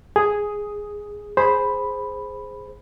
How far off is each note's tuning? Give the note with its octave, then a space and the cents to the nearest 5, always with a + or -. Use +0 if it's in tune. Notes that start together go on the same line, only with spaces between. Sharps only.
G#4 +0 D#6 +5
G#4 +0 C5 +0 B5 +0